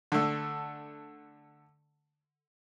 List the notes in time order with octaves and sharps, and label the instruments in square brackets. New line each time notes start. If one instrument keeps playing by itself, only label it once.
[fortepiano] D3 A3